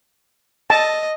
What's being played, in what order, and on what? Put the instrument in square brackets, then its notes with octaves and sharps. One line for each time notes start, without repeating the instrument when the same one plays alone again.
[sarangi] D#5 [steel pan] A5